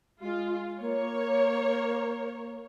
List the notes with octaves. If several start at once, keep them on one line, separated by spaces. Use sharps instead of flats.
G#3 F4
A#3 C#5